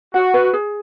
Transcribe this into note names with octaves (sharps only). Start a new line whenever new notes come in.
F#4 F#5
B4
G#4